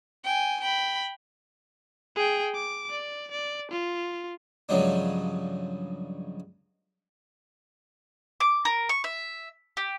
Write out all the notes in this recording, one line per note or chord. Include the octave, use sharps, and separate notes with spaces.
G5 G#5
G5 B5
G#4 G5
D6
D5
D5
F4
G2 C#3 F3 F#3 G#3 D4
D6
A#4
C#6
E5
G4